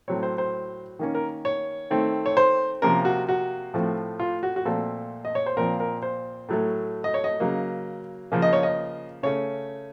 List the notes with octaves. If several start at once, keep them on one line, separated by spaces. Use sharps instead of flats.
A2 F#3 C4 C#5
C5
C5
D#3 A#3 C#4
A#4
C#5
D#3 A3 C4
C#5
C5
C3 F3 A#3 C#4 A#4
F#4
F#4
A2 F3 A3 C4
F4
F#4
F#4
A#2 F3 A3 C4 A4
D#5
C#5
C5
A#2 F3 C4 A#4
A#4
C5
A2 F#3 A3
D#5
C#5
D#5
C#3 F#3 A#3
C#3 F3 A#3 C#4
D#5
C#5
D#5
C#3 A3 C#4 C#5